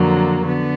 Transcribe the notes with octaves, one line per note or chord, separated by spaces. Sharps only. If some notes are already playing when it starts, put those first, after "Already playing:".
Already playing: F2 D3 F#3 A#3
D3 B3